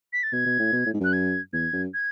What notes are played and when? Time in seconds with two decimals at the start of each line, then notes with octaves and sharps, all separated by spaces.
0.13 B6
0.23 A6
0.33 B2 G#6
0.46 B2
0.59 A2
0.72 B2
0.86 A2
0.94 G#2
1.00 F#2 F#6
1.13 G#6
1.53 E2 G#6
1.73 F#2
1.94 G#6